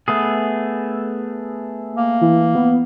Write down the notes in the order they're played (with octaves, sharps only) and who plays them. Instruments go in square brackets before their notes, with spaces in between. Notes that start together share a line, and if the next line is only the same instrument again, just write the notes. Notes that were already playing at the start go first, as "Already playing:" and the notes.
[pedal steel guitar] A3 B3 G#4
[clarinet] A#3
[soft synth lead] E3
B3